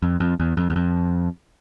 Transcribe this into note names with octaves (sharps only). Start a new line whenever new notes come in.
F2
F2
E2
F2
E2
F2